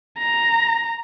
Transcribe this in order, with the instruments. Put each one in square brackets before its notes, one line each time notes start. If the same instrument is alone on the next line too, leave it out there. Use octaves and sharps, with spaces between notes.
[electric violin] A#5